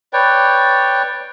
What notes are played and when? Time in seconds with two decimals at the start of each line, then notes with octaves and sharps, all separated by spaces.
0.13 B4 C#5 D5 G5